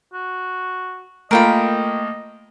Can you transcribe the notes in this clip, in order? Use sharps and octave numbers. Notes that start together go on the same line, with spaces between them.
F#4
A3 A#3 F4 A#4 D#5 G5 B5